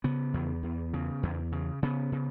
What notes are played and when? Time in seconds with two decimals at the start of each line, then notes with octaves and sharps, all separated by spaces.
0.04 C#3 B3
0.34 E2
0.63 E2
0.94 C#3
1.23 E2
1.52 C#3
1.83 C#3 B3
2.12 C#3